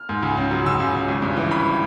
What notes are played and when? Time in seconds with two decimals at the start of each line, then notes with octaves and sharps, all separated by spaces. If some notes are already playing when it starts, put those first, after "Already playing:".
Already playing: F6
0.09 G#2
0.23 C#2
0.37 C#3
0.51 F#3
0.66 C#2 E6
0.80 C#2
0.94 C#3
1.08 G#1
1.22 G2
1.36 E3
1.51 G#1 B5